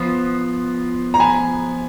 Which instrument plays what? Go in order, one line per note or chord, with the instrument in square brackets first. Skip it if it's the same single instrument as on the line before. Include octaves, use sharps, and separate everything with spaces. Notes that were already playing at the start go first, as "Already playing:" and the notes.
Already playing: [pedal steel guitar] F3 B3 F4
[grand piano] A#5
G#5 B5